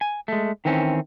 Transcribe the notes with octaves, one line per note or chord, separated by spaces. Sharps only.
G#5
G#3 A3
D#3 E3 C4 C#4